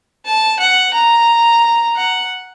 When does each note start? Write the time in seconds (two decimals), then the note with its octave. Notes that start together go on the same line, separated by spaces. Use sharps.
0.25 A5
0.60 F#5
0.94 A#5
1.96 F#5